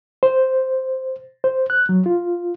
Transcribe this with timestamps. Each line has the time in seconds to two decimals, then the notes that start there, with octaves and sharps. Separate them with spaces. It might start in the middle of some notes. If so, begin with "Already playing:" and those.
0.23 C5
1.44 C5
1.70 F#6
1.89 F#3
2.06 F4